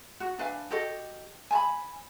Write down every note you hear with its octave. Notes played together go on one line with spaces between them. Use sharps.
F#4
D4 B4 F5 G#5
F#4 G4 A4 D#5
G#5 A5 B5